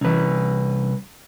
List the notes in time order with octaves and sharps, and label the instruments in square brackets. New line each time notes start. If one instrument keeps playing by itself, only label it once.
[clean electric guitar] C2 B4 [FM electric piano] E3 C#4